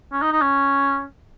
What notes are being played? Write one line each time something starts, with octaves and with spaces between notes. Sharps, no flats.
C#4
D#4
D#4
C#4